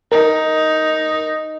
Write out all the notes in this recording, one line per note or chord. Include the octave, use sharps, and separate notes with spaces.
D#4 A#4